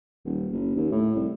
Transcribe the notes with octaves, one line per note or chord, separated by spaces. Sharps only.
D#1
F#1
D#2
A2
C2